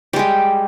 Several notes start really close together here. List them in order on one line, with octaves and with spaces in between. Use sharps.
G3 G#3 G4